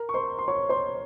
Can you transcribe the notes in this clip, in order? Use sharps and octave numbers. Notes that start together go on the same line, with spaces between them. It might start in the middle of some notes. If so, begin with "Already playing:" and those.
Already playing: A#4 A#5
C#6
C5 C6
C6
C#5 C#6
C5 C6